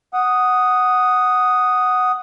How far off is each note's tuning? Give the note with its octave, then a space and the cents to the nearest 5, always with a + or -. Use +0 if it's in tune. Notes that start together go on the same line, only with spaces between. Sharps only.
F#5 +0 D#6 +0